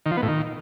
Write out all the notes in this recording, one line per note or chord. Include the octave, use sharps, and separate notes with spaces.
D#3
F3
B3
A2
D#3